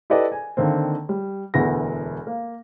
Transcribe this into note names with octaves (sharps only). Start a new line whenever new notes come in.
E4 G4 A4 B4 D5 D#5
G#5
D3 D#3 A#3 C4
G3
E1 D2 B3 E4 F#5 A#6
A#3